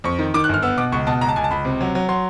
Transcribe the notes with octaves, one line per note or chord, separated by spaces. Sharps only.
F2 C#6
D#3
D#3 D6
F#6
G1 F6
B3 E6
B2 D6
C#2 C#6
B2 A5
C#2 A#5
A5
C#2 G#5
A5
C#2 B5
C3
F#3
F#3
F#3 C6